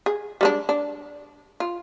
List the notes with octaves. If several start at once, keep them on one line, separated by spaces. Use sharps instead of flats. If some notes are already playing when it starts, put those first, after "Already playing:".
G#4
G3 G#3 D4
D4
F4